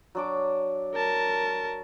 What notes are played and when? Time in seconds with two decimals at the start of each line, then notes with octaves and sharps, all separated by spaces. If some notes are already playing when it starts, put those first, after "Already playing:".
0.15 F#3 D4 D6
0.95 A#4 A5